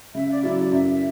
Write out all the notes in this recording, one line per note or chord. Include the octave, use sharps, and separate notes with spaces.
C#3 E5
D5
F#3 C#4 E4 D5
D5
F#2 E5